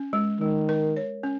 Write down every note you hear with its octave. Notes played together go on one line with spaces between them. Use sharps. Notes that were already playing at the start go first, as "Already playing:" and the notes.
Already playing: C#4
G#3
D#3 G#3
A#4
C#5
C#4